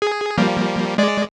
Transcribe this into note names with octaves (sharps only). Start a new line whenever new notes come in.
G#4
F3 G3 A#3
G#3 D5